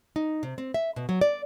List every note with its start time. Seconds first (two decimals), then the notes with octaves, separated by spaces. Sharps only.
0.16 D#4
0.43 C3
0.58 C4
0.74 E5
0.96 B2
1.09 F#3
1.21 D5